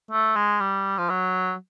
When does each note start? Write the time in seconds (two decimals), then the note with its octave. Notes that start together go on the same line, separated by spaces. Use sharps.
0.11 A3
0.36 G#3
0.60 G3
0.98 F3
1.09 F#3